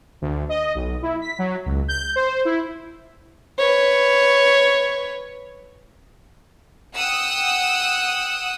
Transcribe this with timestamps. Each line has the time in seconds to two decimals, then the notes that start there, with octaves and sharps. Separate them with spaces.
0.22 D2
0.49 D#5
0.75 B1
1.02 E4
1.21 B6
1.39 F#3
1.66 C#2
1.88 G6
2.16 C5
2.45 E4
3.59 B4 C#5
6.95 F#5 G5 D#6 E6 F#6